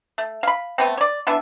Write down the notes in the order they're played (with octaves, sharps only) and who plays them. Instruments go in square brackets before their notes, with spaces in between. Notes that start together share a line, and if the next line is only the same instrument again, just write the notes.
[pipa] A3
F5 B5
A3 B3 C4
C#5 D5
E3 B3 D4 E5